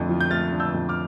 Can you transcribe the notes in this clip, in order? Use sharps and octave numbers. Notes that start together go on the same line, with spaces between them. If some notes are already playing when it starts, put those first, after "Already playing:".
Already playing: F2 D3 A3
F3
G6
A3 F6 A6
D3
E6 G6
F2
D6 F6